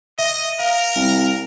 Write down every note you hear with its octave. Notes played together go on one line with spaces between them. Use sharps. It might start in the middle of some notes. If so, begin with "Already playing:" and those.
D#5 E5
A#4 F5
C2